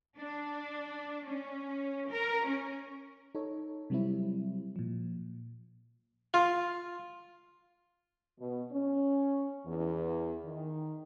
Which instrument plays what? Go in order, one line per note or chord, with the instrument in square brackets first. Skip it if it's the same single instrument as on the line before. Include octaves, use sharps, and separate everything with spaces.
[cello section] D4
C#4
A#4
C#4
[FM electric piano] D#4 A4 C#5
C3 F#3 G3 C4 E4
A#2 F3
[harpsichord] F4
[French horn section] B2
C#4
E2
D#3